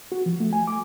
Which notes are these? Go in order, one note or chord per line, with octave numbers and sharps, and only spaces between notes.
F#4
F3
A3
G#5
D6